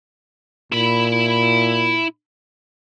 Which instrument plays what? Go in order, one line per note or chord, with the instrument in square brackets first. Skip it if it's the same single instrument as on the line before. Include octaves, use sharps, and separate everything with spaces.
[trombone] A#2 [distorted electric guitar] E4 B5